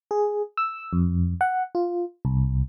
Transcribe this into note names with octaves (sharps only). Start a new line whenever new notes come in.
G#4
E6
F2
F#5
F4
C2